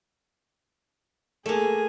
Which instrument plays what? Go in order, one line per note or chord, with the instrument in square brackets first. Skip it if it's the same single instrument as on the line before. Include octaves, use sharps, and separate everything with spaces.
[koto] A3 A#3 [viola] G#4 G#5